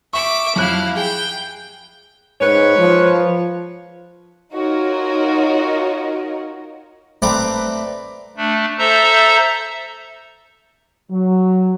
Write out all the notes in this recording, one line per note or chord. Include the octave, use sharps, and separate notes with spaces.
E5 C#6 D6
F2 F#3 E4 F5 F#6
G#4 G5
G#2 B4 C#5
F3
D#4 F4 F#4 A#4 C#5 D#5
A3 C4 B4 D5 A#5 D6
A3 D4
A4 C5 E5 A#5
F#3